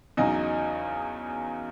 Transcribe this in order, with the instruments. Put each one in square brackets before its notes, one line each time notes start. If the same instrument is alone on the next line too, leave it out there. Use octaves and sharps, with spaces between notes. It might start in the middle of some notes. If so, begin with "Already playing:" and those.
[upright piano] E2 C#3 F#3 D#4 D#5